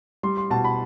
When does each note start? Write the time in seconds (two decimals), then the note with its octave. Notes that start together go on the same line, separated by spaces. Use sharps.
0.23 G3 C6
0.37 C6
0.50 B2 A5
0.64 B5